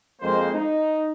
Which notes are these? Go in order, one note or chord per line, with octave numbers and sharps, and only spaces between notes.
F2 G#3 A#3 C5
D#4